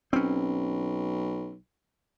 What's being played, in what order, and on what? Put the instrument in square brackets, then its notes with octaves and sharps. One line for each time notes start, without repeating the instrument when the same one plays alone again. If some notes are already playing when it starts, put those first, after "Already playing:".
[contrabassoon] B1 [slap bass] C4 C#4